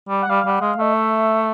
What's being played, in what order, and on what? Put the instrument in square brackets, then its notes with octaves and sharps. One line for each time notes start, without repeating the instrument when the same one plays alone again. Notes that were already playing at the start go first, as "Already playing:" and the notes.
[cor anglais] G3
[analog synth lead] F#5
[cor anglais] G3 [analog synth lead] F5
[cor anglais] G3 [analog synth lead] F#5
[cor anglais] G#3 [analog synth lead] F5
[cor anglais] A3 [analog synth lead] D#5
[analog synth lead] E5